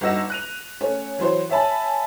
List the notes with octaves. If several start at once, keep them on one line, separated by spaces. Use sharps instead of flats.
G1 D#4 F#4 E6 A#6 E7
F#6 D#7 F7
A3 C#4 C#5
E3 F#3 C5 C#5
C#5 E5 G#5 A5 B5